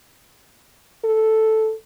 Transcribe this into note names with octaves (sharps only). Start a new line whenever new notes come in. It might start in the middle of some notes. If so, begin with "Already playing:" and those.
A4